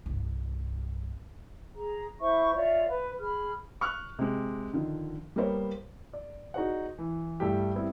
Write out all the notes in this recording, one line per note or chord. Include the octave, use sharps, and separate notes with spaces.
C2 G2
G#4 A#5
E4 C5 E5 C#6
F4 C#5 D5 E5
B4
G#4 B5 F6
C#6 F6 F#6
C3 G#3
D3 D#3 F3
G3 A#3 B3 A#4 C5 C#5
D5
D#4 F#4 G#4 C5 D5 F#5
E3
G2 G3 A3 E4 G4
G3 B3 C4 E4